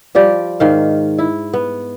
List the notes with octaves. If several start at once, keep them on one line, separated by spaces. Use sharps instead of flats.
F3 G3 G4 D5
G#2 D#3 F5
E4
B3